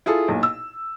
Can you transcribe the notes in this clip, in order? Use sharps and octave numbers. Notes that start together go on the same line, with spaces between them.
E4 F4 G#4 A4
B1 A#2
E6